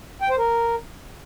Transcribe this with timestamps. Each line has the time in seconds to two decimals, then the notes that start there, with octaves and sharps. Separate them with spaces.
0.21 G5
0.30 C5
0.38 A#4